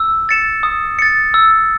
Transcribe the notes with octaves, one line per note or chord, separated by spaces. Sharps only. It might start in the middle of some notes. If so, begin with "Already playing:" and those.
Already playing: E6
A6 C#7 E7
D#6
A6 C#7
E6